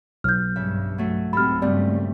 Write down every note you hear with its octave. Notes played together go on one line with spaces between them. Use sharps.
B1 F6 G6
G2 C#3 E5
F#3 A3
G#2 C4 G4 A4 B5 F6
G2 A#2 C#3 G3 A3 C4 D5